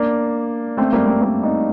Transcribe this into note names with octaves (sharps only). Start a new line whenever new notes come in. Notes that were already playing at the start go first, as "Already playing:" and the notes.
Already playing: A#3 D4
A3 C4
G3 A#3
A3 C4
A#3 D4
C4 D#4